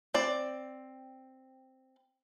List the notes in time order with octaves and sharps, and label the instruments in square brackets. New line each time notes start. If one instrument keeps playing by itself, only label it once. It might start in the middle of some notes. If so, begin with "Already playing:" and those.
[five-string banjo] C4 D5